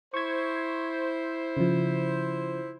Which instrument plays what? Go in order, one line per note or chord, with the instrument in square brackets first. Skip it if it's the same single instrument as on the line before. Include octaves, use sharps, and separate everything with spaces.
[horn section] E4 C5 [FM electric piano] C#6 G#6
[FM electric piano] C#3 F3